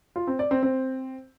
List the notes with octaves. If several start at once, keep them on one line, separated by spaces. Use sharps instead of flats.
F4
C4
D5
C4
C4